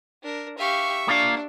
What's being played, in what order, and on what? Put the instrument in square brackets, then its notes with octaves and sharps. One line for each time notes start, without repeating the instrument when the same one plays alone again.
[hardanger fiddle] D4 A#4
[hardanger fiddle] G4 F5 [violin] E5 C#6
[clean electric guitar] A#3 F4 F5 [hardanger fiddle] D4